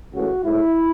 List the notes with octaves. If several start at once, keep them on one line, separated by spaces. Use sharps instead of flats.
C#2 C#3 E3 A3 F#4
G#2 F#3 A3 E4